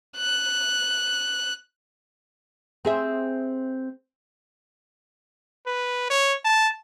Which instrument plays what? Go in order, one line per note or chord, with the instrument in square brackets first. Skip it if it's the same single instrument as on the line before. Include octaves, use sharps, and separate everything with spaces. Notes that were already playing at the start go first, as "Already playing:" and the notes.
[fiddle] F#6
[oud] C4 G#4 E5
[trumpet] B4
C#5
A5